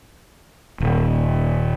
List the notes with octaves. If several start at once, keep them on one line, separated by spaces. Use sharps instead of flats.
D#1